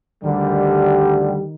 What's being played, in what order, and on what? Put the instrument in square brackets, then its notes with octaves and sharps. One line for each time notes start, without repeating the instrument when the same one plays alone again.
[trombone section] D2 D3 G3 [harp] D#3